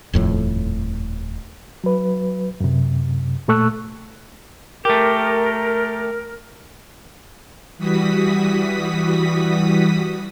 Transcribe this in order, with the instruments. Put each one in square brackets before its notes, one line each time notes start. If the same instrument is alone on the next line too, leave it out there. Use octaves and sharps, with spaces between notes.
[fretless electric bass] D#1 F2 A2
[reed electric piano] F#3 B4
F#2 C3
A#2 A3 A4 C#6 E6 F#6
[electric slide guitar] A3 G4 [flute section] A#4
[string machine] E3 G3 F#4 D#6 B6